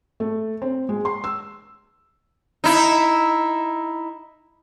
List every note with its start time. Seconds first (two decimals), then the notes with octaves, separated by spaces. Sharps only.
0.20 A3
0.62 C4
0.89 G#3
1.05 C6
1.24 E6
2.64 D#4 E4